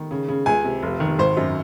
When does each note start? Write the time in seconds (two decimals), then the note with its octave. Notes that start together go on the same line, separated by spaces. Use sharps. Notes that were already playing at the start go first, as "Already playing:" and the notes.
Already playing: D#3
0.11 C#3
0.28 C#3
0.46 C#2 G#5
0.64 C3
0.83 F1
1.00 D#3
1.19 G#1 C5
1.37 F#2